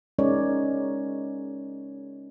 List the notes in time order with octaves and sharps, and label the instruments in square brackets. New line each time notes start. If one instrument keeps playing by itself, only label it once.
[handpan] G#3 C#4 D#4 A#4 C#5 D5